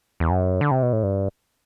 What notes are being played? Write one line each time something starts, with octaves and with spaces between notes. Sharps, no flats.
E2
F#2
D3
C3
B2
A2
G2